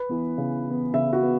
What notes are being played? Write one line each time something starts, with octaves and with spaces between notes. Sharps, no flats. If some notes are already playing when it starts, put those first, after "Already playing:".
Already playing: B4
E3 B3
C#3
E3
B3
C#3 E5
F#4
B3